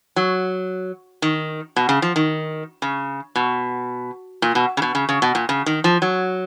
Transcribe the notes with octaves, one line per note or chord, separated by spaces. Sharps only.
F#3
D#3
B2
C#3
F3
D#3
C#3
B2
A#2
B2
C#3
B2
C#3
C#3
B2
A#2
C#3
D#3
F3
F#3